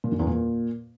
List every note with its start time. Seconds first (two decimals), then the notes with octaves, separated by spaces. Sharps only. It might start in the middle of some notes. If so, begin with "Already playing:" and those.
0.04 A#2
0.12 F#2
0.19 E2
0.27 A#2